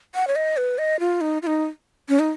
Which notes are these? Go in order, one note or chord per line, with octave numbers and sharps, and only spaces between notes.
F#5
C#5
D#5
B4
D#5
F4
D#4
F4
D#4
C#4
D#4